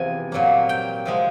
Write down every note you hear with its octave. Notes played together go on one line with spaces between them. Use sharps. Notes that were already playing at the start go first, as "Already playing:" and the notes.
Already playing: E2 C3 F3 G#5
A#2 F#3 A#3
G5
C3 F3 G#3